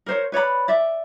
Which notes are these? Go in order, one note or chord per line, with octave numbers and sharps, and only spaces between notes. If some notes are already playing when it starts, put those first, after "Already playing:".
A#4 C5 C#5
B4 C#5 D5 B5
D5 E5